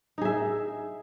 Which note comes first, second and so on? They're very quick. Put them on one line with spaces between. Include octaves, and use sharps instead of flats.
D#4 G#4 E5